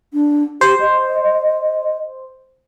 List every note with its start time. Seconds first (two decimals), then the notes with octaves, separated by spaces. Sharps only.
0.14 D4
0.61 G4 C5
0.80 D#5